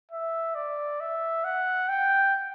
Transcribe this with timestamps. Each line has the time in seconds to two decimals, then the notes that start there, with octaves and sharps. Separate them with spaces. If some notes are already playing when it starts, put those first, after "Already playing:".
0.11 E5
0.55 D5
1.00 E5
1.44 F#5
1.89 G5